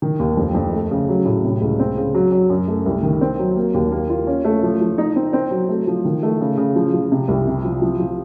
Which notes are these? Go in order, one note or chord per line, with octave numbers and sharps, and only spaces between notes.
D#3
D#2
F2
F2
A3
C#3
F#3
A2
C3
C#2
C4
C#3
F#3
F#3
F#2
A3
C2
D#3
C4
F#3
A#3
D#2
A#3
F4
C#4
A3
F3
F3
D#4
C4
C4
F#3
A3
F3
D#3
A3
C#3
C#3
F3
F3
C3
C2
C3
F3
F3
F3